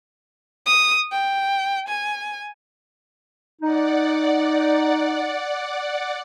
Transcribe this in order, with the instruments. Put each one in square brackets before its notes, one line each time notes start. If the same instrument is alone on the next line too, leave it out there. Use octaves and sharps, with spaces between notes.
[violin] D#6
G5
G#5
[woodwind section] D#4 [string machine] D5 F#5